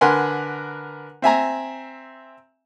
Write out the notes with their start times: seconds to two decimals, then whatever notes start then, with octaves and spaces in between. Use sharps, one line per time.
0.01 D3 A#4 B4 F#5 G#5 C6
1.22 C4 E5 G#5 A#5